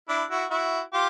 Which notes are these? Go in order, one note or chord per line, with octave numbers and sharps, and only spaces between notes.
D4 E4
E4 F#4
E4 F#4
F4 G4